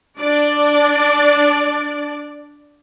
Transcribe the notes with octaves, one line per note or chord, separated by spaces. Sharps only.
D4 D5